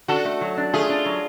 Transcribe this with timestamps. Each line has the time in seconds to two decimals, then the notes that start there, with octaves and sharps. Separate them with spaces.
0.08 D4 F#4 A4
0.25 A3
0.41 F#3
0.57 D4
0.73 A3 F4 G#4
0.90 D4
1.05 F#3